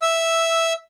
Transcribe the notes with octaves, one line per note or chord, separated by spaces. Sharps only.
E5 E6